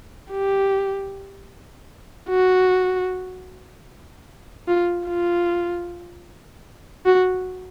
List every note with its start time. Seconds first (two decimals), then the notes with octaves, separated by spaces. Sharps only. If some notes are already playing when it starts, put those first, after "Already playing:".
0.31 G4
2.29 F#4
4.68 F4
5.07 F4
7.06 F#4